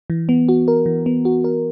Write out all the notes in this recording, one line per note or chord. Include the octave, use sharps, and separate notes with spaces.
E3
B3
F#4
A#4
E3
B3
F#4
A#4